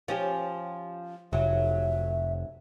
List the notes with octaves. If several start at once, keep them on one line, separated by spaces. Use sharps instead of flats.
F3 C#4 G4
F1 F#3 E5